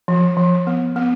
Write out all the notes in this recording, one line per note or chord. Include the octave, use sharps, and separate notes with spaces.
F3
F3
B3
B3